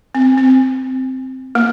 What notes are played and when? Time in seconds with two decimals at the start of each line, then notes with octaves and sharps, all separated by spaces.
0.15 C4
0.38 C4
1.55 A#3